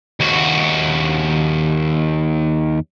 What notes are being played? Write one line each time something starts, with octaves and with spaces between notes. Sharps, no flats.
D#2 F#4